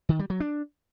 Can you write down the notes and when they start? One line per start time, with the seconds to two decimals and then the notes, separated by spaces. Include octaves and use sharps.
0.09 D#3
0.19 G3
0.30 F#3
0.40 D4